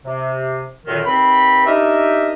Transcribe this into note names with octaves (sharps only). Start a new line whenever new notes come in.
C3
F#2 A#2 D3 D#3
D#2 C4 B4 B5
D4 D#4 G4 A#4 D#5 E5